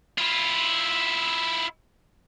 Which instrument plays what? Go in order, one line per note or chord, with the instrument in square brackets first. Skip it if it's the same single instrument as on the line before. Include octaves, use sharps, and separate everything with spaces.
[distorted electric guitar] E4 F4